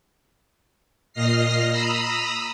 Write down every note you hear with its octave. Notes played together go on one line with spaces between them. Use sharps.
A#2 D#5 F6 A#6 C7
A#5 B5 D#6 E6